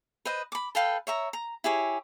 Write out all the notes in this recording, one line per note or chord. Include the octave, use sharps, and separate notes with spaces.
B4 C5 D#5
B5 D6
A4 B4 F5 G5
C#5 E5 A#5
A#5
E4 G4 G#4 C#5